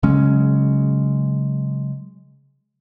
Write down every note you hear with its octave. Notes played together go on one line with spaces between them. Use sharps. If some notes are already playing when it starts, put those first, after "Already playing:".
C#3 F#3 G#3 C#4